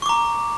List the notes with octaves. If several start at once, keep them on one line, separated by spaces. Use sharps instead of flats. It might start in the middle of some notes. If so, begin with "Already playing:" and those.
A#5 C#6 D6